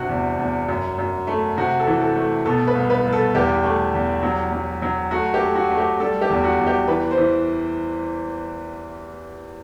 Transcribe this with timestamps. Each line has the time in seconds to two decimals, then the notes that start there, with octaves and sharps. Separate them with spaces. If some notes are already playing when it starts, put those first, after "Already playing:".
Already playing: G2 C3 F#4
0.09 E2
0.39 E2
0.68 F#2
0.98 F#2
1.27 A3
1.57 C3 F#4
1.80 A4
1.87 E3
2.01 A4
2.16 A3
2.45 B2 A4
2.67 B4
2.75 C2
2.90 B4
3.04 C2
3.13 A4
3.35 E2 G4
3.63 A3
3.93 E2
4.23 F#3
4.52 F#3
4.82 F#3
5.11 A3 F#4
5.34 G4
5.41 A3
5.55 F#4
5.71 A3
5.78 G4
6.00 G3 A4
6.21 G4
6.30 E2
6.44 F#4
6.58 E2
6.67 G4
6.88 E3 B4
7.11 C5
7.18 E3